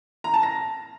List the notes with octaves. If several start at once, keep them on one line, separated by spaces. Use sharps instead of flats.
A#5
A5
A#6